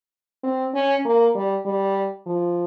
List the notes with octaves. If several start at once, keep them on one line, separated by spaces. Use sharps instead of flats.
C4
C#4
A#3
G3
G3
F3